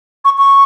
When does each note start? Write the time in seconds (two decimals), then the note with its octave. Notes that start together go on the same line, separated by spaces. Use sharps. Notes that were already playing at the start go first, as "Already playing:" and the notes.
0.25 C#6
0.38 C#6